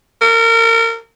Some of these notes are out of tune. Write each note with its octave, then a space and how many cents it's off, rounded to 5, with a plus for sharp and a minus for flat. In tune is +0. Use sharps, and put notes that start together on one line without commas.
A#4 -30